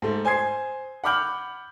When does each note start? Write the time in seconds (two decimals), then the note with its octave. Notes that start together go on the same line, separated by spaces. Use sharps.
0.02 G#2 A3
0.25 C5 G#5 D#6 G#6 C7
1.04 F#5 B5 D6 F6 G6 F#7